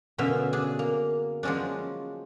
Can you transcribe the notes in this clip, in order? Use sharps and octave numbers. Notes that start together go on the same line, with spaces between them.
F#2 B2 D3 C#4 E5 F5
D4 G#4
A#3
F3 F#3 G#3 C#4 D4